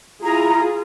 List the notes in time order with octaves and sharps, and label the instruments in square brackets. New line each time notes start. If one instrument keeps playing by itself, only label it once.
[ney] E4 [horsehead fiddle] F4 [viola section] G#4 [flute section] A#5